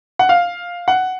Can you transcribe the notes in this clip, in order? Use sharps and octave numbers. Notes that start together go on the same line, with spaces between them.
F#5
F5
F#5